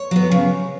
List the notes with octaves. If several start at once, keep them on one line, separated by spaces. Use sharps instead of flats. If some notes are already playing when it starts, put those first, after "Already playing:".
Already playing: C#5
F#3 B3
C#3